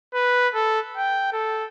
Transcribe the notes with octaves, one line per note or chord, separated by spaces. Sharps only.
B4
A4
G5
A4